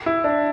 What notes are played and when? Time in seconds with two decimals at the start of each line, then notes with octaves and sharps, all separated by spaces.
0.06 E4
0.24 D4